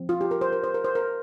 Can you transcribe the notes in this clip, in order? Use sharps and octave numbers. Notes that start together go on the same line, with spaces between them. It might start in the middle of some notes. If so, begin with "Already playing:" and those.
Already playing: F3 C4
F4
G4
A#4
C5
A#4
C5
A#4
C5
A#4